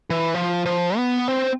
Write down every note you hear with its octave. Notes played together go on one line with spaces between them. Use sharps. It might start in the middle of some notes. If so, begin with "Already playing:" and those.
E3
F3
F3
B3
C4